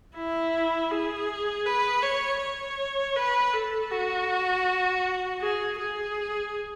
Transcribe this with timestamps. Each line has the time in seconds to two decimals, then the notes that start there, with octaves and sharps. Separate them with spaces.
0.16 E4
0.91 G#4
1.66 B4
2.03 C#5
2.40 C#5
3.16 B4
3.54 A4
3.92 F#4
5.41 G#4
5.80 G#4